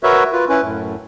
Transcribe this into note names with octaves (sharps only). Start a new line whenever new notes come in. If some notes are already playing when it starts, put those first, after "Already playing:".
F#4 A#4 B4 C#5 E5
F4 B4
C#4 E4 B4
F#2 A2